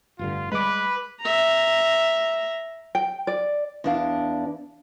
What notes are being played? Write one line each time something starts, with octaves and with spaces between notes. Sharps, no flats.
F1 G2 D3 F4
G3 G#3 B4 B5 D6
E5 A#5
G5
D5
E2 D4 F5